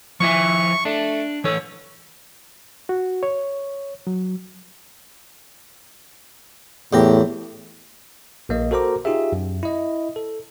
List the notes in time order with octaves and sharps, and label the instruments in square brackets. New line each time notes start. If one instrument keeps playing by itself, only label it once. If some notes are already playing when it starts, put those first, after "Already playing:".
[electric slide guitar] F3 E4 E5 [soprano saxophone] C#6
[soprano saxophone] A3 [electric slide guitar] D4
[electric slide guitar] E3 A4 [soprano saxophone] C#5
[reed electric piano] F#4
C#5
F#3
[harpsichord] E2 G4 A#5 [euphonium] A2
[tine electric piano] A#1 A#3 D#5
F#4 A4 A#4 C5 A#5 D6
D#4 F4 G4 G#4 E5
F#2
E4 D#5
A4